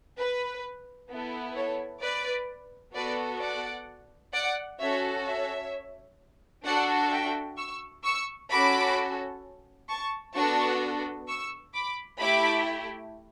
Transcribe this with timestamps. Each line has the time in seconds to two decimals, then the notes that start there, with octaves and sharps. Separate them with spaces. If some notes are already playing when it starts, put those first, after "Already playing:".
0.17 B4
1.10 B3 E4 A4
1.55 A4 C#5
2.02 B4 D5
2.95 B3 F#4 A4 B4 D5
3.41 D5 F#5
4.33 D5 F#5
4.80 C#4 F#4 A4 C#5 E5
5.26 C#5 E5
6.64 D4 F#4 A4 D5 F#5
7.11 E5 G5
7.57 C#6 E6
8.04 C#6 E6
8.50 C#4 F#4 A4 B5 D6
9.89 A5 C#6
10.35 B3 D4 F#4 A4 A5 C#6
11.28 C#6 E6
11.74 B5 D6
12.20 A3 E4 G4 B5 D6